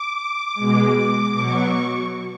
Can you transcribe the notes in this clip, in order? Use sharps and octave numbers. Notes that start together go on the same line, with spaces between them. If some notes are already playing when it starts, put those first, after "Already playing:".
Already playing: D6
B2 G#3
B2 F#3 C#6